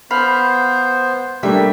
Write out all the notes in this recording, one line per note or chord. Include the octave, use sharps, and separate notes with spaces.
B3 C5 F5 B5
G3 A3 A#3 D4 E5